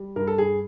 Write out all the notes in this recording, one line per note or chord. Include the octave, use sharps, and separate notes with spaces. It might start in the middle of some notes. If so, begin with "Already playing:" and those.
Already playing: G3
G2 A#4
A4
G2 G#4